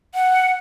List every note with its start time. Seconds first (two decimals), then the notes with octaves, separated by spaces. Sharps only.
0.14 F#5